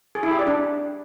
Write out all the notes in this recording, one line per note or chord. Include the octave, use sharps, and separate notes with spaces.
G#4
E4
G4
D5
D4